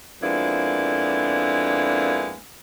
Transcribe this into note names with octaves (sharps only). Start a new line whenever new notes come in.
F2 G#3 A#3 B3 D4 E4